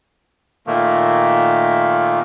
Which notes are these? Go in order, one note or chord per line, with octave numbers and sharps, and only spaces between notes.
A#2 D#3 A3 A#3